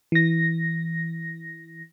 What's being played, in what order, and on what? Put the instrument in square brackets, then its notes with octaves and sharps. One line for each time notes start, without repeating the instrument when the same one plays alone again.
[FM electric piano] E3 A#6